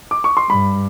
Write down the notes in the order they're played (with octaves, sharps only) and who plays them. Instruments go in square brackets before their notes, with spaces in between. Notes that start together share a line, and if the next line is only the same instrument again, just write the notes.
[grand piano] D6
C#6
C6
[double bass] G2 [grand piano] B5